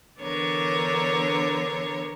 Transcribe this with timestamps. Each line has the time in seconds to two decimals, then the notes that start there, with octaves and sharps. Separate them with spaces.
0.21 D3 E3 B3 D4 A#4 C#5